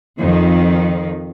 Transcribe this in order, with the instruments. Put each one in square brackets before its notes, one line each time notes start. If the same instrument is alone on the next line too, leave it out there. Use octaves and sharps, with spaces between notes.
[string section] F2 D#3